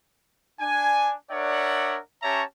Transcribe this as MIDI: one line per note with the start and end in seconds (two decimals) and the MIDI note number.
0.60 1.13 62
0.60 1.13 80
1.31 1.99 62
1.31 1.99 70
1.31 1.99 73
1.31 1.99 74
1.31 1.99 76
1.31 1.99 78
2.23 2.42 61
2.23 2.42 67
2.23 2.42 73
2.23 2.42 76
2.23 2.42 81
2.23 2.42 82